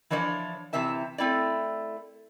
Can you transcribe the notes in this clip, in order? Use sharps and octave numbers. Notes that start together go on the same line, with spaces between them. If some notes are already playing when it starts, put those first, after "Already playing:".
E3 F3 D4 C#5 D5
C3 E3 C4 E5 A5
A3 C4 E4 D5